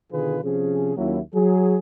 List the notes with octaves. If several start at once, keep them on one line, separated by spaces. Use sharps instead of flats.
B2 D3 D#3 F4 G#4 B4
C3 F3 C#4 G#4
D#2 F#3 A#3 C#4 E4
F#3 G#4